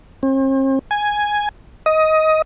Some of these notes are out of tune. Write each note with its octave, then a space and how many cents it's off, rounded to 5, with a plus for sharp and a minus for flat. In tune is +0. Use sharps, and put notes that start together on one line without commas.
C4 +45
G#5 +0
D#5 +15